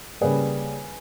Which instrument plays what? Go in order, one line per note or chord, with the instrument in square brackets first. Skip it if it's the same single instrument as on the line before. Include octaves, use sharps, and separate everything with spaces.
[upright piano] C#3 G3 A#3 G#4 B4